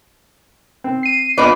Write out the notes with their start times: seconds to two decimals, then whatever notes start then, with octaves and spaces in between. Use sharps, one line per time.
0.84 C4
1.03 C7 D#7
1.38 A#2 B3 D4 B4 D5 D#5